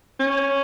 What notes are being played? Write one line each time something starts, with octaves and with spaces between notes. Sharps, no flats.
C#4